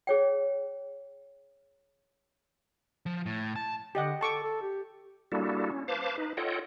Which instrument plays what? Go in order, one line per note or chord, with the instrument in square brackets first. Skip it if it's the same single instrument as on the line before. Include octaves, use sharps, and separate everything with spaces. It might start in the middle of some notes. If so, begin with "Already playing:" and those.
[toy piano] G#4 C#5 G5
[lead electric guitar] F3
A2
A5
[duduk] D3 [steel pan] G4 D#5 F#5
[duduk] A4 [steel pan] A5 C#6 D6
[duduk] A4
G4
[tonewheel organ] G3 A#3 D4 E4 F#4 A4
C#4
B4 C5 F5 A5 D6
D#4 B4
F4 A4 C#5 D#5 F#5 G5